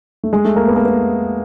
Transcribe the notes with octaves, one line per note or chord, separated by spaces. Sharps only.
A3
G#3
A3
A#3
B3
A#3
B3